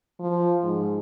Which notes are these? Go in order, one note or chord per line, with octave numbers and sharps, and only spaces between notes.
F3
G#2